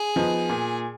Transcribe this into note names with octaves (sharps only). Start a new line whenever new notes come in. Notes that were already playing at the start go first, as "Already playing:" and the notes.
Already playing: G#4
F3 B3 D#4
A#2